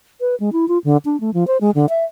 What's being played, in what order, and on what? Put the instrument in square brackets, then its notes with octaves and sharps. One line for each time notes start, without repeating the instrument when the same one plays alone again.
[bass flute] B4
G#3
E4
F4
D3
D4
A3
F3
C5
G#3
D3
E5